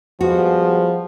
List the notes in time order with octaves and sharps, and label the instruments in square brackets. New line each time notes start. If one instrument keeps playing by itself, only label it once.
[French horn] F3 [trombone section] G3 G#3 B3 [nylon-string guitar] F#4